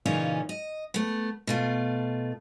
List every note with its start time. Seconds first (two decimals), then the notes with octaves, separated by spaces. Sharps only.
0.06 A#2 C#3 E3 C#4 D#4 F4
0.49 D#5
0.94 A3 B3
1.47 B2 A3 F4